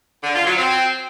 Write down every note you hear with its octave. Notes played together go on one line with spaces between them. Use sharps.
D3
F4
F#3
C4